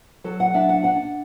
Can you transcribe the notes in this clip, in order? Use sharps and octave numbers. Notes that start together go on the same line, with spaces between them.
F#3 A4
F#5
D4 E5
F#5
D4 F#5